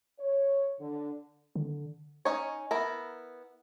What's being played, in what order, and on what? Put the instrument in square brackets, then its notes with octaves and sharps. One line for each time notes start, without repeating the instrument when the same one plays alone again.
[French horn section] C#5
D3
[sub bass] D3
[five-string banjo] C#4 D#4 C#5
B3 E4 A#4